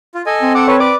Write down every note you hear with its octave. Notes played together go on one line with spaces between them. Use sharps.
F4
A4 D#5 G#5
C4
A4 F#5 D6
A4 B4 C#5
B4 D5 D6